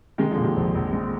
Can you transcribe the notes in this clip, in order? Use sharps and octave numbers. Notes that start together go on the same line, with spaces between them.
C3 D#3 G#3
D3 F3
A#2
C3 D#3
A#1
A#1
G#3